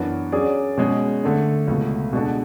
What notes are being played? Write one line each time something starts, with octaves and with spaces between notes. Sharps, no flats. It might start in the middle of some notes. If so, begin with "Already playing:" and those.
Already playing: F#2 E3 B3 D4 F#4
F#3 C#4 G#4 D5
B2 G#3 C#4 G#4
D3 A3 D4
C#2 B2 A3
B2 G#3 D4 F#4 A4